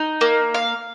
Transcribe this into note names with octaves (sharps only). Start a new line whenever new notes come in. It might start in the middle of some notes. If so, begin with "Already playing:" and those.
Already playing: D#4
A#3
F5